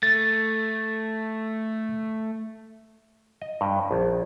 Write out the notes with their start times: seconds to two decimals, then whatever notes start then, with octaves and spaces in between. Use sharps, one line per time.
0.03 A3 A6
3.42 D#5
3.61 G2
3.91 A#1